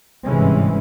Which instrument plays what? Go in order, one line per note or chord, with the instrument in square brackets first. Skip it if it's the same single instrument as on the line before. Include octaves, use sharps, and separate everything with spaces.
[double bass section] G1 G#2 C3 E3 G#3 C#4